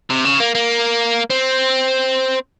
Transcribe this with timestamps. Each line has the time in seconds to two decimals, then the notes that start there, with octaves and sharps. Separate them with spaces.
0.10 C3
0.25 C#3
0.40 A#3
0.55 A#3
1.30 C4